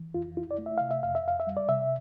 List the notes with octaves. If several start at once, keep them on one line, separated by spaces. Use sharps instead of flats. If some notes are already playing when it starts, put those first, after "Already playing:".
Already playing: E3
F2 F4
E4 F4
D5
A3
E5
C3 F5
E5
F2 F5
E5
F2 F5
E5
G3
D5
C3 E5